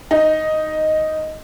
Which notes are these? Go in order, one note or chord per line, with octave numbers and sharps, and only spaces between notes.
D#4